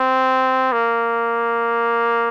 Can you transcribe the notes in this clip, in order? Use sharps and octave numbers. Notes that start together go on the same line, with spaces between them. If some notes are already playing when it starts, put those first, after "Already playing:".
Already playing: C4
A#3